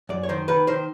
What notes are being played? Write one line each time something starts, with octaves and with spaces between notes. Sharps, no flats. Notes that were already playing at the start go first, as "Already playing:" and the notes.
F#2 D5
C#5
D#3 C5
D#3 B4
D#3 C5